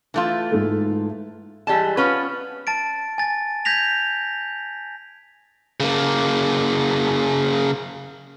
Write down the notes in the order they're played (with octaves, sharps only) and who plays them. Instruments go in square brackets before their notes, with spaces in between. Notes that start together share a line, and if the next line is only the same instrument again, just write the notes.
[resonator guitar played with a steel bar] E3 A3 F4
[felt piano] G#2 G#3 A4
[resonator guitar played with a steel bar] E3 G3 G#3 A5
B3 C#4 F4 B4
[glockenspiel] A5 A6 D7
G#5 A6
G6 G#6 A#6 B6 F7
[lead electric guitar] C#3 A#3